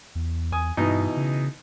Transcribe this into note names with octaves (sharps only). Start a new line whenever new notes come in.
E2
E2 G#5 D#6
G2 B2 E3 D#4
C#3